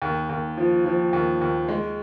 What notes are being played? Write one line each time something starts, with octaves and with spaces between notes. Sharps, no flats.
D#2
D#2
F3
F3
D#2
D#2
G#3